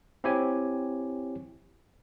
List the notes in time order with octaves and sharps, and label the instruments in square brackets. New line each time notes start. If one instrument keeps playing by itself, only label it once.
[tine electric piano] C4 E4 G4 C#5 G#5